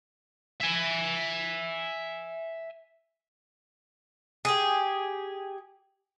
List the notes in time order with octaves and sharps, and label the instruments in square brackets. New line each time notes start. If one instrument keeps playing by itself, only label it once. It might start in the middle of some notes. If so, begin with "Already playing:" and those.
[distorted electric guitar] E5 G#5
[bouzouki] G4 G#4